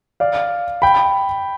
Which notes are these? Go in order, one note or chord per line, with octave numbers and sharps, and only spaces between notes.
D5 F5
G5 B5